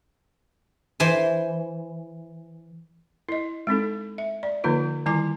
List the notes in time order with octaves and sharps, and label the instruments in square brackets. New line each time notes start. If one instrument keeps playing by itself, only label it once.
[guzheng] E3 C5 G#5
[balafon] E4 D#5
G#3 C4 D#4 A4
E5
D5
D3 F3 A#3 D#4 F4 B4
D#3 G3 E4 G#5 D6